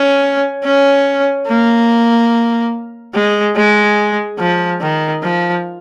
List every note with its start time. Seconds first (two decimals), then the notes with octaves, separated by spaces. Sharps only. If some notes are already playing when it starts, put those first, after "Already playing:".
Already playing: C#4
0.64 C#4
1.47 A#3
3.14 G#3
3.56 G#3
4.39 F3
4.81 D#3
5.23 F3